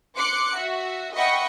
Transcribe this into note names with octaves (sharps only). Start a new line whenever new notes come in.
C6 D6 F#6 C#7
F#4 E5
D#5 E5 F#5 G5 B5 C#6